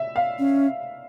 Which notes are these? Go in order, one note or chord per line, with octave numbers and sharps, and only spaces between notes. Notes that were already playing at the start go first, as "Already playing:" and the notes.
Already playing: E5
F5
C#4